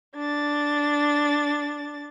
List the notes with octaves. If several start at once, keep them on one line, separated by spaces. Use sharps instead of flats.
D4 A6